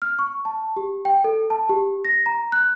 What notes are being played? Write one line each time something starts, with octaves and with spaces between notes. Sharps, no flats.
F6
C#6
A5
G4
G5
A4
A5
G4
A#6
A#5
F#6